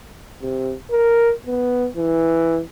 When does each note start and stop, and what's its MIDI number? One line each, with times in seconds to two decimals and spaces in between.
0.42 0.74 48
0.91 1.32 70
1.47 1.88 59
1.96 2.60 52